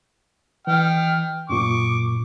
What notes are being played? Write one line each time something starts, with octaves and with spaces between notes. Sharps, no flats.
E3 G5 F6
F#2 A#2 C#6 D6